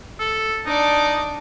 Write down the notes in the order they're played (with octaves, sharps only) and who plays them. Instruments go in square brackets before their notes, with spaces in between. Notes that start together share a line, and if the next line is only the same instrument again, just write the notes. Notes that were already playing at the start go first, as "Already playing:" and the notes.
[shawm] A4
[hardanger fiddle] D4 D5 [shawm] D#4